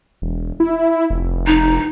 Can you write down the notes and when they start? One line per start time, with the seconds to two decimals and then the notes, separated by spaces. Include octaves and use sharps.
0.22 E1
0.60 E4
1.10 F1
1.47 D#4